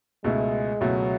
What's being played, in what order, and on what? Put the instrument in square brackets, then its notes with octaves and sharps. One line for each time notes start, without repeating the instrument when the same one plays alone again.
[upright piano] C#2 B2 A3 E4 [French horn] G#3
[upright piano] C#2 B2 A3 E4 [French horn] F#3